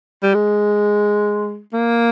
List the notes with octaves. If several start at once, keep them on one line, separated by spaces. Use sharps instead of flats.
G3
G#3
A#3